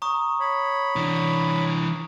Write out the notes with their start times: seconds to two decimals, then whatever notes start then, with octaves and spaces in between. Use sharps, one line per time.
0.02 A#5 C#6 D#6
0.40 C#5 B5
0.96 E3 D4